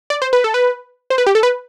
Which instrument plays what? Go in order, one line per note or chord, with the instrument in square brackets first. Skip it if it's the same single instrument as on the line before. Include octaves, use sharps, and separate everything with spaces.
[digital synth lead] D5
C5
B4
A4
B4
C5
B4
G4
A4
B4